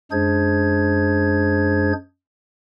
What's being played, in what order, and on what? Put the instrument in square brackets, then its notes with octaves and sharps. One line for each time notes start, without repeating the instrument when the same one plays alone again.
[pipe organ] F#2 G#3 D4 G#4 C5 G#6